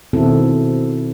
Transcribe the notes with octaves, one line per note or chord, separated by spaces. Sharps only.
B2 D#3 C4 E4 A4